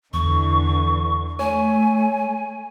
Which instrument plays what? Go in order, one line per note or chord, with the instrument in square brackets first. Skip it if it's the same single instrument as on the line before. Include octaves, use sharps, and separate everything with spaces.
[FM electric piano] E2 [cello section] D3 E3 [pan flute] C#6
[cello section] A3 [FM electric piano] C#5 [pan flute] G#5